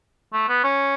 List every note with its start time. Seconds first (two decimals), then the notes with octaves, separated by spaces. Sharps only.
0.33 A3
0.49 B3
0.64 C#4